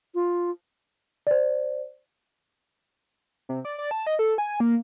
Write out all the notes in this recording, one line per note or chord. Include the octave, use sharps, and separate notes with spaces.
F4
C5 D5
C3
D5
D5
A5
D#5
A4
G#5
A#3